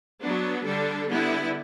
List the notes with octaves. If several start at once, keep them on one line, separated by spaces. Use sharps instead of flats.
F#3 B3 D4
D3 G3 D4 A4
D3 G3 B3 E4